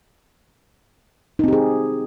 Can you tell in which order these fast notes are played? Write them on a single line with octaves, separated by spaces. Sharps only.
D#4 C4 G4 G#4